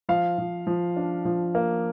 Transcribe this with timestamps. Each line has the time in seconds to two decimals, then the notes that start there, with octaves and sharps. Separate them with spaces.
0.09 F3 F5
0.38 F3
0.67 F3
0.96 D4
1.25 F3
1.55 A#3